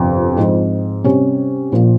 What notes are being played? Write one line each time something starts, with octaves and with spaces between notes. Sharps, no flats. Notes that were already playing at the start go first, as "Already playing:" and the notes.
Already playing: G1 F2 C3
G#2 F3 C4
C3 G3 C#4 G4
A#1 A#2 F3